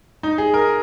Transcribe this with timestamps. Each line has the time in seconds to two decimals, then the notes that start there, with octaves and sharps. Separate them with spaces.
0.23 D#4
0.38 G#4
0.54 A#4